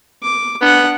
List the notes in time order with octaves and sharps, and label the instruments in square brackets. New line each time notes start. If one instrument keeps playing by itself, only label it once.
[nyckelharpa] D6
[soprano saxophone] B3 [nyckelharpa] D4 F#5